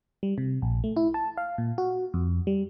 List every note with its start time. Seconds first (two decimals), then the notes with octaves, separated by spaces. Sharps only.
0.23 G3
0.38 C3
0.62 A#1
0.84 A3
0.97 E4
1.14 A5
1.37 F5
1.58 A#2
1.78 F#4
2.14 F2
2.47 G3